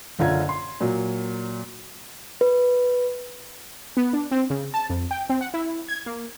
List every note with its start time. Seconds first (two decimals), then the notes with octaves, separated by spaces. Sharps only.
0.19 F#1 D3 C#4 F4 A#5 G#6
0.49 C6
0.81 A#2 F#3
2.41 B4
3.97 B3
4.13 D4
4.31 C4
4.50 C#3
4.74 A5
4.89 F2
5.11 G5
5.29 C4
5.41 F#5
5.54 E4
5.88 G#6
6.06 A#3